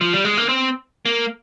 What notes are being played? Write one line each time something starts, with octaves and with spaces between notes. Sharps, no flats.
F3
G3
G#3
A#3
C4
A#3